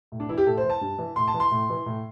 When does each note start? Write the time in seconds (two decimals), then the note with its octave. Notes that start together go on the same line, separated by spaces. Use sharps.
0.12 A2
0.20 D4
0.29 E3 E4
0.38 G4
0.46 A2 A4
0.57 C5
0.64 E3
0.70 A5
0.81 G2
0.98 E3
1.16 A2 C6
1.28 A5
1.34 E3
1.40 C6
1.51 A2
1.70 E3
1.86 A2